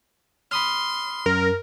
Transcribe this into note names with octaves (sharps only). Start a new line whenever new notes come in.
B5 C6 D#6 F6
F#2 A#4